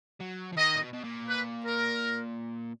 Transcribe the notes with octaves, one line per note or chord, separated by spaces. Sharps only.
F#3
F3
D#3 D#5
A#2
B2
B2
A#2
B4
A#4